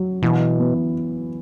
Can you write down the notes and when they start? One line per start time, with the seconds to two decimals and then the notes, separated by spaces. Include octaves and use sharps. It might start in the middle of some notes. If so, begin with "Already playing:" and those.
Already playing: F#3
0.22 B2 E3
0.59 B3